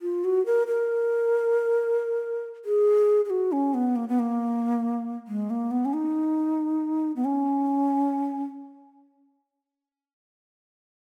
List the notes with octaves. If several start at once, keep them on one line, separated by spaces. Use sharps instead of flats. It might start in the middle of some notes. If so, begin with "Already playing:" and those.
F4
F#4
A#4
A#4
G#4
G#4
F#4
C#4
B3
A#3
B3
A#3
G#3
A#3
B3
C#4
D#4
B3
C#4